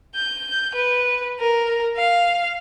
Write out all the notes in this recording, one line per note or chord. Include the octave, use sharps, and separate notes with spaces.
G6
B4
A#4
F5